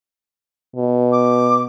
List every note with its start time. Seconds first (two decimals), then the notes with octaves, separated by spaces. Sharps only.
0.76 B2
1.12 D6